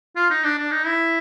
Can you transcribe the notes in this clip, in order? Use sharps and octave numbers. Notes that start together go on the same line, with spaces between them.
F4
D#4
D4
D4
D#4
E4